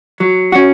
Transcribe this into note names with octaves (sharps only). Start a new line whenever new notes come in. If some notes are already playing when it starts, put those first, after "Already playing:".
F#3
C#4 F#4